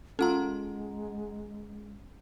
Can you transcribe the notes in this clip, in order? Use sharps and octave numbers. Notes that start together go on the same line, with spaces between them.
G#3 C#4 F4 A4 F#5 A#5